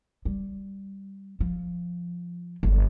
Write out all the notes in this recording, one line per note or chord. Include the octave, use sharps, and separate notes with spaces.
G3
F3
G1